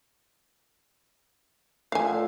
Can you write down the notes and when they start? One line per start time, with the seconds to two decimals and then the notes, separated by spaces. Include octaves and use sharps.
1.92 A2 D3 F3 F5 G#5